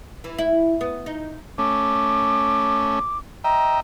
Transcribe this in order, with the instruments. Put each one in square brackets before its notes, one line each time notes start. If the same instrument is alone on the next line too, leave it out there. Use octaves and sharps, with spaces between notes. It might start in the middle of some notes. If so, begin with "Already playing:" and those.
[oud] E3
E4
B3
D#4
[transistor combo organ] A3 C#4 [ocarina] D6
[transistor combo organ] D#5 E5 G5 [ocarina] A#5